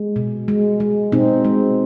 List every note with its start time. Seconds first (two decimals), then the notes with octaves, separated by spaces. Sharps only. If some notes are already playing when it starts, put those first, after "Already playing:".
Already playing: G#3
0.16 B2
0.48 G#3
0.80 G#3
1.12 B2 C4 D#4
1.45 G#3